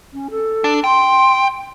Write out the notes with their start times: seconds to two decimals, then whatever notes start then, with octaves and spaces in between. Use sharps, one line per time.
0.13 C#4
0.31 A4
0.64 D4
0.84 G5 C6